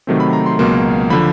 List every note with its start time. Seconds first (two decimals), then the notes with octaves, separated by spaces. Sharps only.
0.07 C3 D#3 F#3 A3 C4
0.20 B5
0.33 A#5
0.46 C6
0.59 C#2 B2 F#3 A#3 C6
1.10 D3 F3 B5